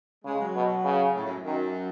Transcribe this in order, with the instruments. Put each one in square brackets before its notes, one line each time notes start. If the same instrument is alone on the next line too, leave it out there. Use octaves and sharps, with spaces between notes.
[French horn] C#3 [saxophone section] G#3
[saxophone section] F#3
[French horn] B2
C#3
[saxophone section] A2
F#2
[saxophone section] F#2 [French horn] D#3